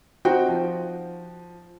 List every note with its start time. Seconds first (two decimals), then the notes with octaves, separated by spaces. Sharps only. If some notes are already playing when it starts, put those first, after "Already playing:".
0.25 C4 D#4 F#4 G5
0.48 F3